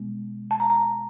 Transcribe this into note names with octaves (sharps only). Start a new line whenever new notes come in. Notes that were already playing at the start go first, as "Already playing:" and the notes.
Already playing: B2 G#3 B3
A5
A#5
A#5